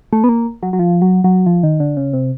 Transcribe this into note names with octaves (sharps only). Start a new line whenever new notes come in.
A3
B3
A#3
F#3
F#3
F3
F#3
F#3
F3
D#3
D3
C#3
C3